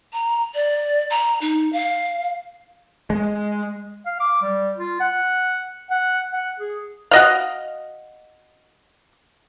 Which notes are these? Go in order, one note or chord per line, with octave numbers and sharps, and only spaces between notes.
A#5
D5
A#5
D#4
F5
G#3
F5
D6
G3
F4
F#5
F#5
F#5
G#4
F#4 D#5 F5